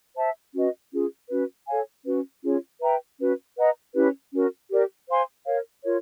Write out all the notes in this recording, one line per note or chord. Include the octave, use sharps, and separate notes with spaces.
C5 E5 A5
C#4 F#4 B4 D#5
C#4 F4 G#4
C#4 F#4 B4
A4 C#5 F5 G#5
C#4 F#4 B4
C#4 F4 G#4 C#5
B4 E5 G5 A#5
C#4 F#4 B4
B4 D#5 F#5 A#5
C#4 E4 G4 B4
C#4 F#4 A#4
G4 A#4 D5
C5 F5 G#5 C6
A#4 C#5 F5
F4 A#4 C#5